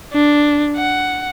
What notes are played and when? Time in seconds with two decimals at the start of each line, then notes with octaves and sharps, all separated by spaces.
0.14 D4
0.77 F#5